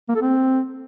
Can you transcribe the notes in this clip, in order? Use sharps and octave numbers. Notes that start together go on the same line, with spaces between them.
A#3
A4
C4